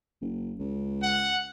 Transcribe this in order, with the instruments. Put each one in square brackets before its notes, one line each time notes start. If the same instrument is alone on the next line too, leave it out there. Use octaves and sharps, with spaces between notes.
[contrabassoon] F#1
C#2
[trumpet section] F#5